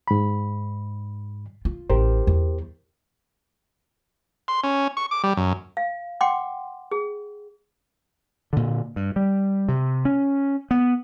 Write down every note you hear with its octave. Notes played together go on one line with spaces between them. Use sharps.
G#2 B5
F4
A1 G4 A#4 C5
E2
C6
C#4
C#6
D6
G3
F#2
F5
F#5 G5 C6 D6
G#4
A#2 D3
G2
G3
C3
C#4
B3